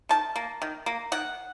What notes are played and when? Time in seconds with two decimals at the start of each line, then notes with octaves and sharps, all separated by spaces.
0.09 D#3 A5
0.36 A#3
0.62 D#3
0.86 A#3
1.12 D#3 F#5